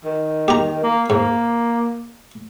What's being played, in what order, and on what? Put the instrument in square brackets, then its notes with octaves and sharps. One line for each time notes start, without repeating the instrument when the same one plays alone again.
[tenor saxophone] D#3
[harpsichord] G4 A#5
[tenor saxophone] A#3
[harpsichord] G#2 [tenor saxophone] A#3